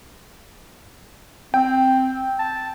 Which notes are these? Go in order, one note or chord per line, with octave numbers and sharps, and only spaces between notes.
C4 G5
A5